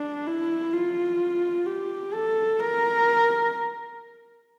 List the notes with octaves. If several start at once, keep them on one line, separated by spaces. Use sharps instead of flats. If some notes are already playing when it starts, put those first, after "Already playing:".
Already playing: D4
E4
F4
G4
A4
A#4